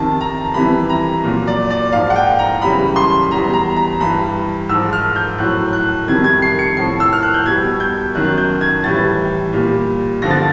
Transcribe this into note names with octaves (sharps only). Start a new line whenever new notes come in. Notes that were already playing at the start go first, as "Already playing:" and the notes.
Already playing: F2 C3 D#3 A5
A#5
F2 C3 E3 G3 B5
A#5
A#2 F#3
D5
D5
G#2 F3 F5
F#5
G5
A#5
F#2 C#3 E3 G3 B5
C6
E2 B2 G3 A#5
A#5
A#5
G2 E3 G3 B5
G#2 F3 E6
F6
G6
A2 F#3 F#6
F#6
F2 C3 D#3 G3 G#6
G#6
C7
C#7
A2 F3 C7
E6
F6
F#6
G6
B2 G3 G#6
G6
F#2 D#3 F#3 F#6
G6
G#6
A2 E3 G3 A6
A#2 G3
G2 D3 F3 A#6
A6